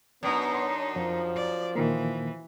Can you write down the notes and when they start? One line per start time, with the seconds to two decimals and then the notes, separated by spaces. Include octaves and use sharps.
0.23 F#2 B3 D4 D#4
0.54 C#5 C6
0.96 F2 F3
1.35 D5
1.75 A#2 D#3 E3 A#3